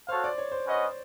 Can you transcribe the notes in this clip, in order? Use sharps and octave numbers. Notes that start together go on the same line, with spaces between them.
F#4 A4 C5 C#5 F5
D5
C#5
C5
C#4 F#4 B4 D#5